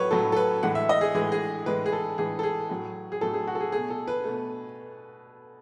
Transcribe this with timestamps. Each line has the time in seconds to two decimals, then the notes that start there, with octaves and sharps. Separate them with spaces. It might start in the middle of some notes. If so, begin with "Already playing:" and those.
Already playing: A2 F#3 A3 B4 C#5
0.11 A2 F#3 A3 A4
0.32 A4
0.36 B4
0.63 A2 E3 G#3 F#5
0.75 E5
0.89 D#5
1.01 G#4
1.14 A2 E3 G#3 G#4
1.32 G#4
1.66 A2 E3 G#3 B4
1.86 G#4
1.92 A4
2.18 A2 E3 G#3 G#4
2.39 A4
2.43 G#4
2.69 A2 F#3 A3
3.12 G#4
3.21 A2 F#3 A3 A4
3.34 G#4
3.47 F#4
3.55 A4
3.60 G#4
3.72 B2 A3 G#4
3.90 A4
4.08 B4
4.24 B2 A3